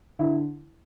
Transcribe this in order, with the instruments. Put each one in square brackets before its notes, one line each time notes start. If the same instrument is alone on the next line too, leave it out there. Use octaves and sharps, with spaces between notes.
[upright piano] D3 E4